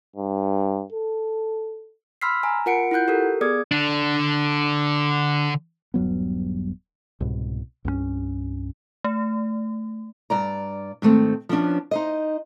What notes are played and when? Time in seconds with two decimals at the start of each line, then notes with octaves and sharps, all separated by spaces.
0.16 G2
0.92 A4
2.21 B5 C6 E6 F6 B6 C7
2.43 G#5 A#5
2.66 F4 A#4 F#5 C#7 D7
2.91 E4 F4 F#5 F#6 G6
3.08 G4 A4 A#4
3.41 B3 G#4 D5 D6 D#6 G#6
3.71 D3 D4
5.94 D#1 G2 F#3 B3
7.20 C2 G#2 B2
7.85 C2 G2 G3 C#4
9.04 A3
10.30 G2 D5 A#5
11.02 G#2 D#3 A3 C4
11.49 F3 B3 C#4 D4
11.91 D#4 C5 D#5